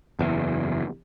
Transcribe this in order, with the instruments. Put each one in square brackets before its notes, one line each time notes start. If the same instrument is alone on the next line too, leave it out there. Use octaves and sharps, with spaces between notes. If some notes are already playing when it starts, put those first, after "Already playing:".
[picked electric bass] F#1 E2